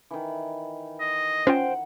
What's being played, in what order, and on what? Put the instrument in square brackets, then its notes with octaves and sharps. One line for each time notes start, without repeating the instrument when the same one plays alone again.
[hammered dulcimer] D#3 E3
[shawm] D#5
[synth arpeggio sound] C#4 F4 [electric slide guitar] C5 G5 [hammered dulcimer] F#5